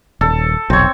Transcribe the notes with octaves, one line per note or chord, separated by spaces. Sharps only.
D#1 A4
F1 B1 C4 C#5